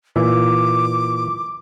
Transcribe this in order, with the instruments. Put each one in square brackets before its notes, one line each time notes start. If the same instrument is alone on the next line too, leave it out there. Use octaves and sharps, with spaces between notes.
[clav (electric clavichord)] A#2 E3 E5 [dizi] D6